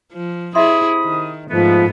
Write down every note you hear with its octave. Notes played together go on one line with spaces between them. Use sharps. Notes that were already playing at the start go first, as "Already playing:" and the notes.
F3
C3 E4 G#4 D#5 E5 B5 C6 D#6
D#3
G#2 F3 A3 B3